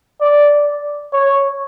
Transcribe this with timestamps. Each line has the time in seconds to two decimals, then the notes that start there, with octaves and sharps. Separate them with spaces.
0.21 D5
1.14 C#5